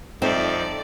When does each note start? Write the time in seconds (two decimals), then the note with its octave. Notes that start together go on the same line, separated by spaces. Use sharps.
0.22 F2 C4 D#4 A4 C5 D5 E5